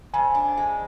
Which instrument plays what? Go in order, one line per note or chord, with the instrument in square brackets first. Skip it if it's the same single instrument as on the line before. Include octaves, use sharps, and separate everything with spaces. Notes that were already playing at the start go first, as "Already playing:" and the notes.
[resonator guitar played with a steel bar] F2 [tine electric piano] G#5
[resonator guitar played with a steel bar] D4
G#3